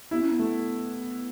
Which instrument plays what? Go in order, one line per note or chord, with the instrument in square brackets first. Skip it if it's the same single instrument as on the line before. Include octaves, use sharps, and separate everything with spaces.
[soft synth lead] B3 [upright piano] E4
[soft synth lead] C#4
B3
[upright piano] A3